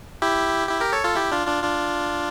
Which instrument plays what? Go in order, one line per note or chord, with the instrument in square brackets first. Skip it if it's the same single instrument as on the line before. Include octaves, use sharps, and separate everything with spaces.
[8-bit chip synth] E4 G4
E4 G4
G4 A#4
A4 C#5
F4 A4
E4 G4
D4 F4
D4 F4
D4 F4